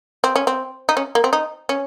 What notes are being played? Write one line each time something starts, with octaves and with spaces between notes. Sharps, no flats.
C4
C#4
C4
D#4
C#4
A#3
C4
D#4
C#4